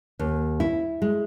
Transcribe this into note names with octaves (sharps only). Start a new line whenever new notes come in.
D#2
E4
G#3